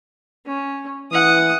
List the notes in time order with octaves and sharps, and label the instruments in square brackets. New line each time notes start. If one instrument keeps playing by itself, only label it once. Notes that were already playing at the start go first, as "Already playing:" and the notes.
[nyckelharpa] C#4
[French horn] E3 [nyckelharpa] F#5 D#6